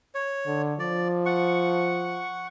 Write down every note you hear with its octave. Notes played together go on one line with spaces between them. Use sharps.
C#5
D3
F3 D5
F#5 C#6